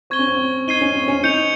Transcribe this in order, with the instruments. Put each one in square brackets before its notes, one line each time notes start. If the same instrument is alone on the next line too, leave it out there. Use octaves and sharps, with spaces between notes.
[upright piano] C4 [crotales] C#6 G#6 D#7 G7
[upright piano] C#4
C4
[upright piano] D#4 [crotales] G#6 C7 D#7 G7
[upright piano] C#4
C4
C#4
[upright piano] D#4 [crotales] G6 C#7 F7